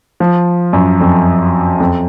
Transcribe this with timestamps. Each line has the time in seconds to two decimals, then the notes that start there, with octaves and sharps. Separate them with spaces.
0.20 F3
0.73 F#2
1.00 F2
1.80 F2